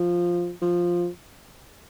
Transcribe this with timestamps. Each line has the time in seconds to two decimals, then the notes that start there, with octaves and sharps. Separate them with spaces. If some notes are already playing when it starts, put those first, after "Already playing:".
Already playing: F3
0.61 F3